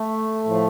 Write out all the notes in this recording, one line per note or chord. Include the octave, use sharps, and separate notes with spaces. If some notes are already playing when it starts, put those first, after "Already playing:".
Already playing: A3
A2 F3